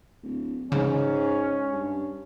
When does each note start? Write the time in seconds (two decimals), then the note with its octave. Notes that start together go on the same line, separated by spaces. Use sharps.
0.23 D1
0.72 G#2 C#3 C#4
1.73 G2